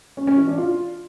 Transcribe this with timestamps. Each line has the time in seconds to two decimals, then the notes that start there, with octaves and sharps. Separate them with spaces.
0.17 C#4
0.27 C#4
0.38 E3
0.48 D4
0.58 F4